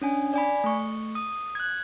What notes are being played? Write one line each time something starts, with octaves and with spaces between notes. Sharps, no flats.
C#4 D4 G#5
D5 G#5 B5
A3 C#6
D#6
F#6 G#6